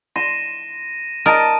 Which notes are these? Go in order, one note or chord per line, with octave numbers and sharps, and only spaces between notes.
C6 A#6 D#7 E7
A#4 D#5 A5 D7 D#7